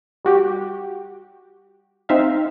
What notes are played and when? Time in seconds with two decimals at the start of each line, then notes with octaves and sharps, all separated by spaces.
0.25 G3 F#4 G4
2.09 C4 D#4 E5 F5